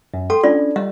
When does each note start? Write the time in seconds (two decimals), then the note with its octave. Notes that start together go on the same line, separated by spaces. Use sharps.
0.14 F#2
0.30 A4 G5 C6
0.43 C#4 D4 F4 D5
0.76 G3 D#5